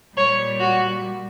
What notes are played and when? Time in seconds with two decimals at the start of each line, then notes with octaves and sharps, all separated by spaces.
0.17 A#2 G3 C#5
0.60 F#4